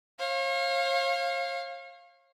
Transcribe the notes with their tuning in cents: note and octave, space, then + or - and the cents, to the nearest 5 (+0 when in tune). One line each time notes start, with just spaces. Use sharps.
C#5 -45 F5 +0